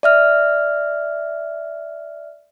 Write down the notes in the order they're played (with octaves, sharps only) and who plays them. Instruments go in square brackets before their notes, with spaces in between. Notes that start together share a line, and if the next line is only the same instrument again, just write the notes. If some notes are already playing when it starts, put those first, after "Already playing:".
[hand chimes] D5 E5 F6